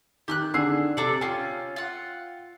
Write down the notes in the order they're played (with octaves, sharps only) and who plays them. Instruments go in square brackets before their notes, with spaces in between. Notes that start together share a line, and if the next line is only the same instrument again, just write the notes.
[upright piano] D#3 [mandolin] G4 F6 F#6
[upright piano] D3 E6 C7 [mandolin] G#4
[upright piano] C3 [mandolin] D4 A4 D5
[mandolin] C#4 F4 [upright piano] G5
[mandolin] F4 F#5